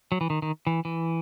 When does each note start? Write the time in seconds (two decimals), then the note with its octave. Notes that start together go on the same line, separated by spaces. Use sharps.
0.12 F#3
0.21 E3
0.30 D#3
0.42 D#3
0.67 E3
0.85 E3